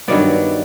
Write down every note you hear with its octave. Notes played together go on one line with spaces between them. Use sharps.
G2 D#3 F#3 B3 D5